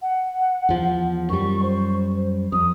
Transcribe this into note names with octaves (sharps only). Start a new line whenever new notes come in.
F#5
E2 F3
F#2 G3 C#6
C5
F2 D#6